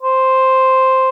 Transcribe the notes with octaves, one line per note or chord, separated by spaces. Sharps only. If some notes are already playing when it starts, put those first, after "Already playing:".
C5